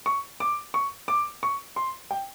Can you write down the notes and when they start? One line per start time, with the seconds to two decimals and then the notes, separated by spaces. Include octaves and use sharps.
0.06 C#6
0.40 D6
0.74 C#6
1.08 D6
1.43 C#6
1.76 C6
2.11 G5